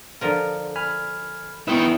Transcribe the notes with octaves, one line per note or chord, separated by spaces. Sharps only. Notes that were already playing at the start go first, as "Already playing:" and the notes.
D3 F3 A#4
G#5 B5 F6
B3 D#4 E4 B4 E5 G5